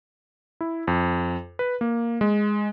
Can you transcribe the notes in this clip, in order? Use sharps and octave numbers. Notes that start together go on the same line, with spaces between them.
E4
F2
B4
A#3
G#3